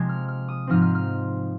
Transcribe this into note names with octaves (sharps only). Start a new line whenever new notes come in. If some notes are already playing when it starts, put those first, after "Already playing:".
Already playing: C3 F3 G#3 G#6
F6
F6
D#6
G#2 F3 C4 D#4 F6
F6
F6